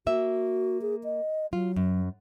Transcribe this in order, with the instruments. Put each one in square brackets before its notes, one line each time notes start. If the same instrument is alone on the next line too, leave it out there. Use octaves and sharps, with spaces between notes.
[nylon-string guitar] A#3 E5 [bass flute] F#4
[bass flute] G#4
D#5
[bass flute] F#3 [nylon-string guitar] F4
[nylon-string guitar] F#2